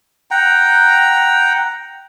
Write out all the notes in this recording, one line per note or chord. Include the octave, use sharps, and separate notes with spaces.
F#5 G5 A#5